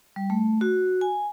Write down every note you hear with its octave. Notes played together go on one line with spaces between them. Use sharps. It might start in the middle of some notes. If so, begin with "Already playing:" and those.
G3
A3
F#4
G#5